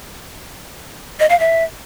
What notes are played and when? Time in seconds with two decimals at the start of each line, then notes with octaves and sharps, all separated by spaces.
1.20 D#5
1.30 F5
1.40 E5